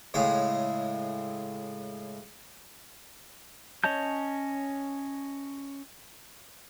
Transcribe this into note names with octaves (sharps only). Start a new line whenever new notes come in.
A2 C#3 G#3 C#5
C#4 C#5 D#5 A5 G6